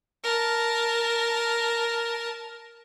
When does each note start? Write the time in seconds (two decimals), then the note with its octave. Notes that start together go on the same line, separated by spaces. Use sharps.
0.23 A#4 A5